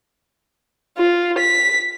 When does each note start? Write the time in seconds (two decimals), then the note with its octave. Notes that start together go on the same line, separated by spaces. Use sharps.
0.98 F4
1.38 B6